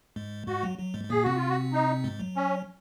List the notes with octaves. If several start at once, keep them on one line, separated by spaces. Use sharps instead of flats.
G#2 G#3
G#2 G#3 F#4
F#3
F#3
G#2 G#3
G#3
A#2 A#3 G#4
C3 C4 F#4
F4
F#4
D#4
G#2 G#3
F#3
C#4